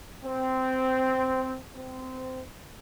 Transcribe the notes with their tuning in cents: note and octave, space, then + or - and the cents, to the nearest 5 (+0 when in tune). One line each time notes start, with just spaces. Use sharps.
C4 -10
C4 -20